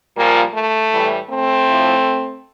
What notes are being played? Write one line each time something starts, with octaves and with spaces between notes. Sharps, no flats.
A#2 F3 G3 A#3
A3
A2 E3 G3
A3 C4
A2 F3